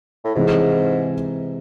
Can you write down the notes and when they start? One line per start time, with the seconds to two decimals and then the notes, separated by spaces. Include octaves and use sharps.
0.25 A2
0.35 G#2 C3 E3 G#3